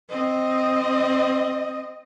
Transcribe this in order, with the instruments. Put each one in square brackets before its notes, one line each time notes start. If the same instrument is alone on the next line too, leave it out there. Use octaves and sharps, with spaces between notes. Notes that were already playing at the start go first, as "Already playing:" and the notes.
[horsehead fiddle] C4 D#5